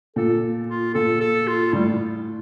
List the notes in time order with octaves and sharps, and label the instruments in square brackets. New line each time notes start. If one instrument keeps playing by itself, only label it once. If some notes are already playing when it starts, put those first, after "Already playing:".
[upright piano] A#2 [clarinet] A4
[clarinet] F4
[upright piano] A#2 [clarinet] A4
[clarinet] A4
F4
[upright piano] A2 [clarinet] G3